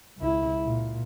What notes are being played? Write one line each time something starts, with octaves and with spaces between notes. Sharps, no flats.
C#2 E4
A#2